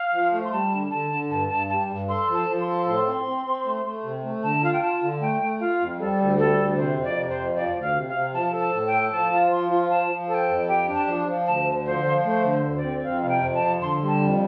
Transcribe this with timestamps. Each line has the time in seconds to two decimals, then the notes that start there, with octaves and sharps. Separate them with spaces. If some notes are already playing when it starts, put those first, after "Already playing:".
Already playing: F5
0.13 F3
0.32 A3
0.45 C6
0.52 G3 A5
0.72 D3
0.91 D3 A5
1.11 D3
1.30 G2 A5
1.49 G2 A5
1.69 G3 A5
1.89 G2
2.09 A4 C6
2.28 F3
2.34 A5
2.48 F3
2.61 C6
2.68 A4
2.86 A2 C6
3.07 C4
3.26 C4
3.45 C4
3.65 A3
3.85 A3
4.03 C3
4.24 A3
4.43 D3 A5
4.63 F4 F5
4.73 G5
4.81 F4 A5
5.02 D3
5.21 A3 G5
5.41 A3
5.60 F4 F5
5.80 F2
5.99 G3 A4
6.19 D2
6.38 G3 A4
6.59 D2
6.77 C3 C5
6.97 F2
7.04 D5
7.17 C3
7.30 C5
7.36 F2
7.56 F3 D5
7.75 D2
7.81 F5
7.95 C3
8.08 F5
8.14 C3
8.34 F3 A5
8.53 A4
8.60 A5
8.73 A2
8.87 G5
8.92 A4
9.12 F3 A5
9.31 F4
9.51 F3 C6
9.70 F4
9.90 F3 A5
10.10 F3
10.29 A4 A5
10.34 G5
10.49 F2
10.68 G4 G5
10.88 D4
10.95 A5
11.07 F3
11.27 F3
11.46 D2 A5
11.66 D3
11.85 F3 C5
12.06 F3
12.25 A3 C5
12.44 D3
12.51 C5
12.64 D2
12.77 D5
12.84 C4
13.03 F2 F5
13.22 C3 F5
13.29 G5
13.43 F2
13.55 A5
13.62 F3
13.81 D3 C6
14.01 G3
14.07 A5
14.21 F2